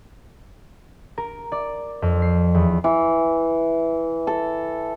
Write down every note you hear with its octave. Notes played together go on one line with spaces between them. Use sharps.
A#4
D5
F2
C7
E2
E3
A4